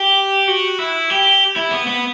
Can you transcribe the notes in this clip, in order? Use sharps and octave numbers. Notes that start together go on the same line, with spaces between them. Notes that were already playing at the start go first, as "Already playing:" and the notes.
Already playing: G4
F#4
E4
G4
E4
B3
B3